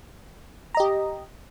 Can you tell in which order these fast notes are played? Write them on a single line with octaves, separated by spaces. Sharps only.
A#5 D#5 G4